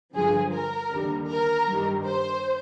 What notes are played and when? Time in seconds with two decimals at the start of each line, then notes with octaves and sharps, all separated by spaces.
0.13 G2 D3 F3 G#4
0.53 A#4
0.91 D#2 D3 G3
1.29 A#4
1.67 G2 D#3 G3
2.06 C5